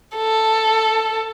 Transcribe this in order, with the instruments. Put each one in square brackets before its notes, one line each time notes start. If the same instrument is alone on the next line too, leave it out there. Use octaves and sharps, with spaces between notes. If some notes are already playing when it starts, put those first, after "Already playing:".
[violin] A4